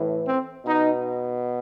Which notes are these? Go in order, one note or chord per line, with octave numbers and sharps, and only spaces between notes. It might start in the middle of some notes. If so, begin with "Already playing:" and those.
Already playing: A2 E3
C4
B2 D#4